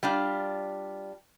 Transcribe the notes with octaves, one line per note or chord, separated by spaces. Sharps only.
G3 D4 F4